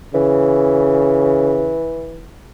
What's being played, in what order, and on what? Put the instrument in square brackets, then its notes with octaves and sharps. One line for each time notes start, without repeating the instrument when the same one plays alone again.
[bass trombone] C#3 [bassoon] E3